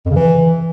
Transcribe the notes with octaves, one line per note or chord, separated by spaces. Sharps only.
F2
C#3
E3